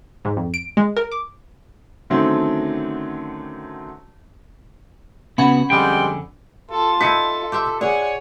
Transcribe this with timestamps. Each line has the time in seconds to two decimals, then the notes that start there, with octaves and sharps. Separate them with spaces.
0.25 G#2
0.37 F2
0.54 D7
0.77 G#3
0.97 A#4
1.12 D6
2.10 D3 D#3 F#3 A3 C4 C#4
5.38 C#2 C#3 B3 C#4 F#4 F#5 B5
5.70 F2 D3 G3 G#3 C4 G5 G#5
6.70 F4 A4 A5
7.01 D#4 E4 A4 B6 C#7 D#7
7.52 G4 C5 E5
7.81 G#4 C#5 D5 F#5 G#5